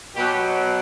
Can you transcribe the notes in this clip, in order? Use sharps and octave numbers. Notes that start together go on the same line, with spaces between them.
B2 F#3 G4